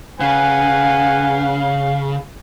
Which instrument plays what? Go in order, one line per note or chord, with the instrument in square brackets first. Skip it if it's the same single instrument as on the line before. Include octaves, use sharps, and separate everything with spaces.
[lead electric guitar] C#3 [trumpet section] B4 F#5 G#5 [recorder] F5